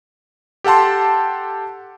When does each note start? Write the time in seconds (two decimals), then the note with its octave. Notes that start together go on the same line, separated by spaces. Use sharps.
0.64 G4 A4 F#5 A5 C6